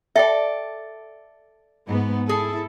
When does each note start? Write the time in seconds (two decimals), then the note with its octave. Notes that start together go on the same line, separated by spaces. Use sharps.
0.16 A4 D5 E5 G5
1.88 G#2 B3
2.29 E4 G#4 A4